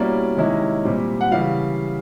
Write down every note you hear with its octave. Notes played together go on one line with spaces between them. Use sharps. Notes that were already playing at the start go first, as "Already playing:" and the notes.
Already playing: B2 G3 A#3 C#4 E4 D5
C3 D#3 G#3 C#4 E4
A#2 G3 C4
F#5
C#3 E3 G3 F5